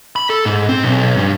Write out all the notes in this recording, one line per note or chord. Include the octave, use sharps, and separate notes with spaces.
B5
A4
G#2
C4
B1
G2